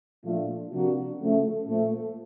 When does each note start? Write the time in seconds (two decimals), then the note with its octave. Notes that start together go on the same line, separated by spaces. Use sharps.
0.24 A#2 F3 A3 D4 F4
0.72 C3 F3 A#3 D4 F#4
1.20 C#3 F3 A3
1.67 A#2 F3 A3